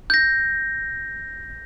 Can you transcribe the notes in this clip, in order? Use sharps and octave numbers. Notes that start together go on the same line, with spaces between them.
G6 A#6